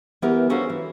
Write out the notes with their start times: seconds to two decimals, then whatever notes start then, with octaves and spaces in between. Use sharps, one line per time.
0.22 E3 B3 E4 G4 A#4 B4
0.50 C#4 F#4 A4 A#4 C5 F5
0.70 E3